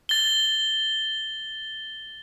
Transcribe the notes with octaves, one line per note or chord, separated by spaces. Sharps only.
A6 G7